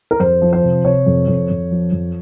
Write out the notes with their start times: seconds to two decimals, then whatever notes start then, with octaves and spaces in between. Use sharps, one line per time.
0.11 A#4
0.20 F2 C5
0.42 F3
0.53 C5
0.63 C3
0.84 C3 C#5
1.06 F2
1.28 F2
1.50 F2
1.71 F3
1.92 F2